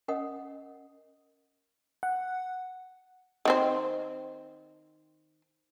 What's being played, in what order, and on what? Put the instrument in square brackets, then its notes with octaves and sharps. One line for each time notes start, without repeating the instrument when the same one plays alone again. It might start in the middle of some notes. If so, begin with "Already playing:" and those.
[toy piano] C#4 A#4 D#5 F#5 D#6
[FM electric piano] F#5
[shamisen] D#3 C4 C5